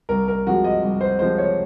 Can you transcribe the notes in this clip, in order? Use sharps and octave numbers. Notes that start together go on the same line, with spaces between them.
C2 A#4
A#4
C3 F3 G#3 F#4
D#5
C2
C5
C3 F3 G#3 C5
C#5